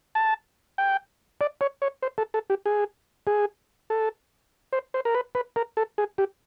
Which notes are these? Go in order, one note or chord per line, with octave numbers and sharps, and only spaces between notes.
A5
G5
D5
C#5
C#5
C5
A4
A4
G4
G#4
G#4
A4
C5
C5
A#4
B4
B4
A#4
A4
G#4
G4